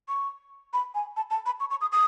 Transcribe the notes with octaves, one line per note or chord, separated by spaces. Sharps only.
C#6
B5
G#5
A5
A5
B5
C#6
C#6
D#6
D#6